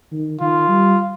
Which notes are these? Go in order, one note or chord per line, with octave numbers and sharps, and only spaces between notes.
D#3
D#3 F4
G3